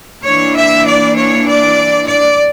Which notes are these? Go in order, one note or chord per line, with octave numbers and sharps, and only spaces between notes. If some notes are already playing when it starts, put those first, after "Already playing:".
E3 A#3 D4 C#5
E5
D5
C#5
D5
D5